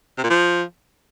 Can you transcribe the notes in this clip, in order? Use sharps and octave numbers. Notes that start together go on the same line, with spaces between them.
C3
A#2
F3